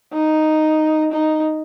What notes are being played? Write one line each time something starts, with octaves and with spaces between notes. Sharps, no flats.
D#4
D#4